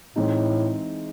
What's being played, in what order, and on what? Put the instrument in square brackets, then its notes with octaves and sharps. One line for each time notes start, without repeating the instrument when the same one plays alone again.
[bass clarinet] A2 [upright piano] E3 G#3 C4 D#4